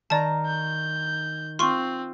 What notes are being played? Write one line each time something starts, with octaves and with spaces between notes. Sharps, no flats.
D#3 D5 A5 A#5
G6
C4 F4 C6 C#6